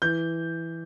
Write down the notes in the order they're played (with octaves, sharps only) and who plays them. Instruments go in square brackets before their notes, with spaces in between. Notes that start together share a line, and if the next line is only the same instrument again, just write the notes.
[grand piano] E3 G6